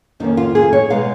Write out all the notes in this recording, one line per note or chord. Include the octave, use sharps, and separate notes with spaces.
F2 D#3 A#3 C#4 D#4
F4
G#4
C#5
B2 G#3 B3 D#4 F5